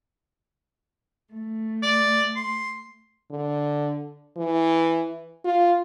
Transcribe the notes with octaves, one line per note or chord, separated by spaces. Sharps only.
A3
D5
C6
D3
E3
F4